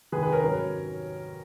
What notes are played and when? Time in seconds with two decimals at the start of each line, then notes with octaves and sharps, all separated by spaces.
0.12 F1 D#2 D#3 G#3 G#4 B4
0.23 G#4 B4
0.33 A#4 C#5
0.43 G#2 F#3 C#4